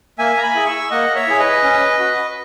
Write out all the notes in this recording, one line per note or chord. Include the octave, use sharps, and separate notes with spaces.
A#3 E5 G#5
A#5
G#5 B5
E4 G#4
C#6 E6
A#3 D#5 F#5
C#5 E5
E4 G#4
B4 D#5
C#4
F#4